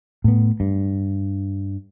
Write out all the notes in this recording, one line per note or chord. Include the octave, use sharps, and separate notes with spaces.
A2 B3
G2